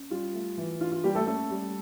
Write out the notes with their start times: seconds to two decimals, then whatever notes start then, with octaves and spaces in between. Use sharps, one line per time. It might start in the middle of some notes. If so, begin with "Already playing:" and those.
Already playing: C#4
0.10 G3 F4
0.34 A3
0.57 E3
0.80 D4 F4
0.92 F4
1.04 G3 A#3 G4
1.15 A3 A4
1.27 A3 C#4 A4
1.50 G3